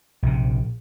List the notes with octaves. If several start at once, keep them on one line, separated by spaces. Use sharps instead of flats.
A#1 C3